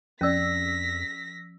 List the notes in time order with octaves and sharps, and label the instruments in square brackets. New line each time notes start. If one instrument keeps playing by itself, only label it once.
[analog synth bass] F2 [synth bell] F3 E6 [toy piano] C#4 D5 [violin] A#6 B6